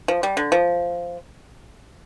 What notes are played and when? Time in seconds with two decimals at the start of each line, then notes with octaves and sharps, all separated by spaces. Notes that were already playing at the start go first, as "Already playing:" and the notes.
0.08 F3
0.23 G3
0.37 D3
0.52 F3